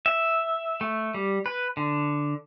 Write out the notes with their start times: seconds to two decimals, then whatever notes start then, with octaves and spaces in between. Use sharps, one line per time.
0.06 E5
0.81 A3
1.14 G3
1.46 B4
1.77 D3